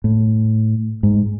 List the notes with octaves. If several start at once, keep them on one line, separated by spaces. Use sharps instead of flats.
A2
G#2